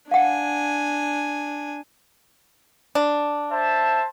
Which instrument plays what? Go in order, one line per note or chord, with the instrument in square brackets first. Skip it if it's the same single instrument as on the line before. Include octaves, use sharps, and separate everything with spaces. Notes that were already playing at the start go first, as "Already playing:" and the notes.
[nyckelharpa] D4 G#5 [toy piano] F5 F#5
[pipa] D4
[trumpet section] C5 E5 A5